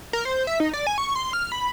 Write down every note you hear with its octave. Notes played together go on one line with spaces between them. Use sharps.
A#4
C5
E5
D#4
D5
G#5
C#6
C6
F6
B5